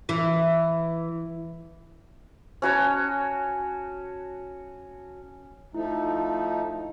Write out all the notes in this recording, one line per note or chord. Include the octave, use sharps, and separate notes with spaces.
E3
C#4 F#4 C#5 A5
F3 A3 D#4 E4